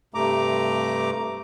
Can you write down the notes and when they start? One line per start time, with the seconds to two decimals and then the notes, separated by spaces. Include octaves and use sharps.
0.14 G2 C3 A3 A#5 D6